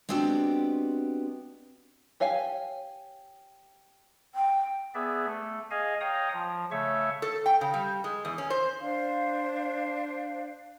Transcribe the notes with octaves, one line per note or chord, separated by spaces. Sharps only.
G#3 B3 C4 D4 F#4 G4
G4 C#5 F5 G#5
G5
B3 G#4 D5 E5
A3
G#4 D#5 F5 G#5
C#5 F5 G5 A#5 D#6
F3
C#3 A3 C#5 E5 C#6
A4
G5
C#3
G3
G#3
E2
C#4
C5
D4 C5 F5